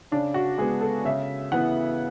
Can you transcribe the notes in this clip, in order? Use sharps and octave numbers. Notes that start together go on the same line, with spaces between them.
C#3 D4
F#4
G#3 B3 G#4
A4
C#3 E5
E3 B3 F#5